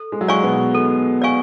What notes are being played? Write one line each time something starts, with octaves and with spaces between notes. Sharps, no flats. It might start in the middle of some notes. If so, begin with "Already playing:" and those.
Already playing: A4
G#3
F#3
G#3 D5 F5 G#5 C#6
B2 B3
A4
D5 F5 G#5 C#6